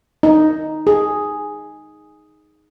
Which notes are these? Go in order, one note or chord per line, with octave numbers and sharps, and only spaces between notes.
D#4
G#4